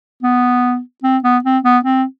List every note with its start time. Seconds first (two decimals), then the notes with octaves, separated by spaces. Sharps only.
0.23 B3
1.03 C4
1.24 B3
1.44 C4
1.64 B3
1.85 C4